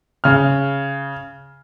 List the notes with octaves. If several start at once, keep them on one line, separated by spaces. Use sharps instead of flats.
C#3 F6